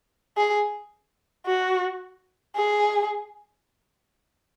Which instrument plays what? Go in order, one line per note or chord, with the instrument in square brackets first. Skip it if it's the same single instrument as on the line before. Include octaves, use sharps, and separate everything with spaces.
[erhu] G#4
F#4
G#4